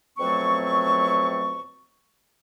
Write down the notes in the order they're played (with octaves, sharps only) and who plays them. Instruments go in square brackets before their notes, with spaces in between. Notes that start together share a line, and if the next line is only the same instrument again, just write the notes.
[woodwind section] F2 B2 F#3 A3 C4 C#6